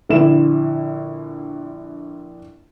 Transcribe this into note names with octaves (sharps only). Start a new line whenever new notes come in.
A#1 D3 E4 E7